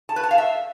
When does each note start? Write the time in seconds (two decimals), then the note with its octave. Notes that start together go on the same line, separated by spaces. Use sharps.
0.09 A5
0.16 B4
0.23 A5
0.31 F5
0.38 E5